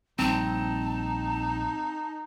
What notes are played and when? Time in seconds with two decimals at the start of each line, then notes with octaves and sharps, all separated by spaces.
0.19 A#1 G3 C4 D#4 A5